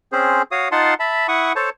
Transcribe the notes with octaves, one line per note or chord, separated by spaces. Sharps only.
C4 C#4 G#4 C5
F#4 C#5 F5 D#6
D#4 F4 F5 F#5 A5 C6
E5 A5 B5
E4 F#5 C#6 D#6
A4 C5 C#5 A5